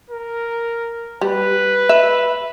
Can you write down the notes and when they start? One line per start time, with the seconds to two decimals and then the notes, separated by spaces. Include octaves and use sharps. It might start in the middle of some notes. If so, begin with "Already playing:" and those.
0.10 A#4
1.21 G3 B4
1.89 E5